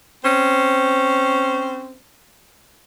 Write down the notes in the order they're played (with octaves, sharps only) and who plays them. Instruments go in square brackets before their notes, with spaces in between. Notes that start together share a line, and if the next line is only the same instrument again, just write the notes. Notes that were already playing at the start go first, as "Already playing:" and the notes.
[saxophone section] C4 C#4 C5